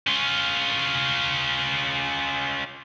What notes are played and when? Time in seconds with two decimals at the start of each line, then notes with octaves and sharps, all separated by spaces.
0.07 C#4 F4